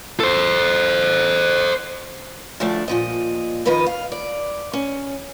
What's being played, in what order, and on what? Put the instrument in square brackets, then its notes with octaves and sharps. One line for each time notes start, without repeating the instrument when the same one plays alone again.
[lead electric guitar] A4 C5
[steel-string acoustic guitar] D2 F3 A3 D4
A#2 F3 D#5
D#3 F3 B3 B4 D#5
F5
D5
C#4